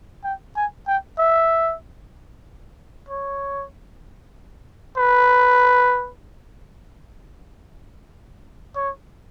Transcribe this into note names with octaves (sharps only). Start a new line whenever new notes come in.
G5
G#5
G5
E5
C#5
B4
C#5